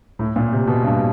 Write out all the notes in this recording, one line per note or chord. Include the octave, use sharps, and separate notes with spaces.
A2
A#2
C3
B2
G2